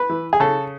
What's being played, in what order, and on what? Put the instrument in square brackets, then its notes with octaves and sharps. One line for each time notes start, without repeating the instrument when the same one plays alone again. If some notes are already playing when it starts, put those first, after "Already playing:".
Already playing: [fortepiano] B4
E3
G#4
C#3 A4